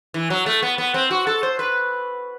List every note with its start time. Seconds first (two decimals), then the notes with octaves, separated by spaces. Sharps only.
0.14 E3
0.30 F#3
0.46 A3
0.62 B3
0.78 B3
0.94 C4
1.11 F#4
1.27 A4
1.43 C5
1.59 B4